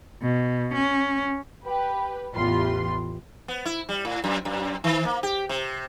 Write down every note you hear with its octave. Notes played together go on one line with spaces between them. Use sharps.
B2
C#4
G4 B4
A1 E2 F4 G4 B4 C6
B3
E4
G3
A2
F#2
F#2
D#3
A#3
G4
C3